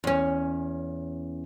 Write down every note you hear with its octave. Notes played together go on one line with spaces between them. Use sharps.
E2 C#4